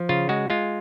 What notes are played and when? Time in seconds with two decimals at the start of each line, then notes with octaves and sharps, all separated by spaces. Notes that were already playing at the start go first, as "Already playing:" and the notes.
Already playing: F3
0.09 C#3 F4
0.29 G#3 F#4
0.50 G#3 F4